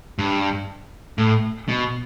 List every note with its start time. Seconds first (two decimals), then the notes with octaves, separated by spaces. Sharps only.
0.18 G2
1.18 A2
1.68 B2